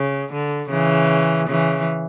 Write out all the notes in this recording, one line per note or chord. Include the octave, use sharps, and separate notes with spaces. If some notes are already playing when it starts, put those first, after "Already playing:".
Already playing: C#3
D3
C#3 E3
C#3 E3